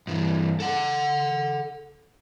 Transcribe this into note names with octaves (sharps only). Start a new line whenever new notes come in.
G2 E3
A4 F#5